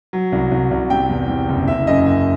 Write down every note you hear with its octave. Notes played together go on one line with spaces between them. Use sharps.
F#3
C2
C2
C2
C3 G5
E2
C3
F#1
F#1 E5
F#2 D#5
F#2 E5